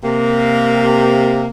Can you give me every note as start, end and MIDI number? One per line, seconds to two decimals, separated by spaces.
0.04 1.48 48
0.04 1.48 58